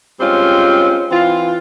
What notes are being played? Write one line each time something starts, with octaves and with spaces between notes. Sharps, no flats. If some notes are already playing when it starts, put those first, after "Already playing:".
G3 G#3 C4 C#4 F4
E3 C4 F4